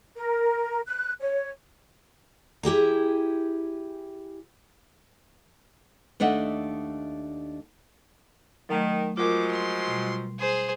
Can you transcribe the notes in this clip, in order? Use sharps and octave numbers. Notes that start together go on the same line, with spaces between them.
A#4
F#6
C#5
E4 G4 G#4 A#5
D#2 A3 D4 D#5 E5 F#5
D#3 F#3 A3
F3 F#3 G#3 F4 A#4 D6
C6
B2 G3
G#4 C5